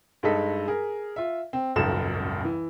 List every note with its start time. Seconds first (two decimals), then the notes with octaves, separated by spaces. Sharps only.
0.23 G2 G#3 D#4 A4 B6
0.68 G#4 A#4
1.16 F4 E5
1.53 C4
1.76 D#1 G#1 C#2 F#2 A4 E7
2.45 E3